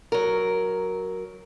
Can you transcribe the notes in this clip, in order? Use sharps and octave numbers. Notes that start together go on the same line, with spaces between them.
F#3 A#4